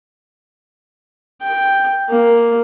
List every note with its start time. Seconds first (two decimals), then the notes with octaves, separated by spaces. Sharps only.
1.42 G5
2.09 A#3